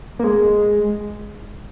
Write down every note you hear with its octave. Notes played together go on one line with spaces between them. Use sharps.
A#3
G#3